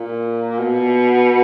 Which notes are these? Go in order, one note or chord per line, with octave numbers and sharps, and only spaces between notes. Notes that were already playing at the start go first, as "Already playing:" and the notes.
Already playing: A#2
B2